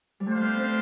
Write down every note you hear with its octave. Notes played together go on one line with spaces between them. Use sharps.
G3
A3 D4 G4 C5 F5
B3
C4